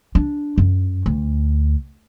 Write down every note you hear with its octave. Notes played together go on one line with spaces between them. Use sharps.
D4
F#2
D2